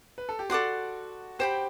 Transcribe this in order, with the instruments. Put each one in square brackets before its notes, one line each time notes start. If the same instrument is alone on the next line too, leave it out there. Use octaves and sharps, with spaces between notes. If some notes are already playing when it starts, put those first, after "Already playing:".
[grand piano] B4
A4
G4
[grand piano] F#4 [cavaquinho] A4 D5 F#5 C6
[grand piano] G4 [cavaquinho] C5 G5 B5